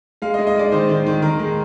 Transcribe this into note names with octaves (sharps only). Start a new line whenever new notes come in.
G#3 F5
D#5
G#3
D#5
G#3 D5
D#3 C5
D#3
D#3
D#3 A#4
G#3